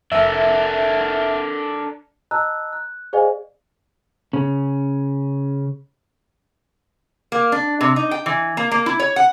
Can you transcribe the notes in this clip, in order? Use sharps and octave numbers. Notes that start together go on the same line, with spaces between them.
F1 D4 A4 A#4 E5
D#5 A5 A#5 E6 F#6
F#6
G#4 C5 D5 D#5 F5 G#5
C#3 C#4
A#3
D4
C3
D#4
G5
E3
A#3
A#3
E4
C#5
F#5